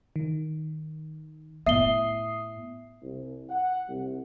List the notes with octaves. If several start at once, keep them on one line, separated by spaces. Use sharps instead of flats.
D#3
A2 B3 E5 D#6 C7 G7
C2
F#5
C2